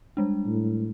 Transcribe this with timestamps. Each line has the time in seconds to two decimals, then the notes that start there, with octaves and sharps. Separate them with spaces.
0.17 G3 G#3 D4
0.47 A2